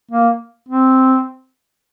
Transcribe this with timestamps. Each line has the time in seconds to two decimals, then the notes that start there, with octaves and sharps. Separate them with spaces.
0.11 A#3
0.69 C4